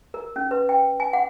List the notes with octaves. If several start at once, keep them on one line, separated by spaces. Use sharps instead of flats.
A#4
C#4
B4
G5
G#5
F#5